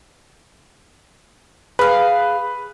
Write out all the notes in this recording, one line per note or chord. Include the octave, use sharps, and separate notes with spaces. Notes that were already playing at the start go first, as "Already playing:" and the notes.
G#4 B4 F5 B5